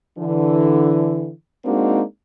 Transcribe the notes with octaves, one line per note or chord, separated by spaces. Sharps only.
D3 E3
G#3 A#3 C4 D4 D#4 F#4